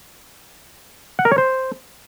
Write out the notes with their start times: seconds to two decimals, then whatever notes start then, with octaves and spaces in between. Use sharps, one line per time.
1.19 F#5
1.25 A#4
1.32 C#5
1.38 C5